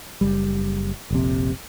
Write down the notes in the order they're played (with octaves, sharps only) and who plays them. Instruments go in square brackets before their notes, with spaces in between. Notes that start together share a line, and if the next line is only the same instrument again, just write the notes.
[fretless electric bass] F#1 G3
F1 A#1 C3